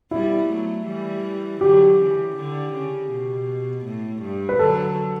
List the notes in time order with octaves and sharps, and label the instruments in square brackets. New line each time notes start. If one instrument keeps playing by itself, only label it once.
[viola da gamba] G3 B3 [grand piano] E4
[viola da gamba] F#3 A3
E3 G3
[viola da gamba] D3 F#3 [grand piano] G4
[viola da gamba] C#3 E3
D3
C#3
B2
A2
G2
[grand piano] B4
[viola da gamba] D3 F#3 [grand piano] A4